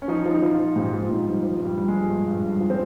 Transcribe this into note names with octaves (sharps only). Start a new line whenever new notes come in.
C#4
F3 D#4
F3
D#4
F3
F4
F3
G#2 G4
F3 F4
G#2 D#4
F3 G3
F3
G2 F3
G3
G2 G3
G#3
F3
G2
G2
G2
F3
C4